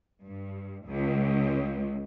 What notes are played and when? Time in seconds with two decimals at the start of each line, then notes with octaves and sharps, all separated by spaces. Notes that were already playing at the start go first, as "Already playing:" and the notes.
0.24 G2
0.85 C#2